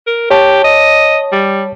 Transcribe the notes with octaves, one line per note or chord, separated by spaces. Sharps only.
A#4
G4 C#5 A5
D#5
G3